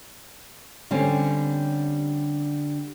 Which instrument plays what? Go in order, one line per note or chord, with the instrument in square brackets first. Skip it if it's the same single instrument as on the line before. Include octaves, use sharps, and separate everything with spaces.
[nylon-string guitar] D3 G3 C4 C#4